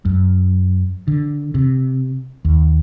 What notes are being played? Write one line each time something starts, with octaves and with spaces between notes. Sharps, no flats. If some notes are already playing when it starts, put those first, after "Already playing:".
F#2
D3
C3
D#2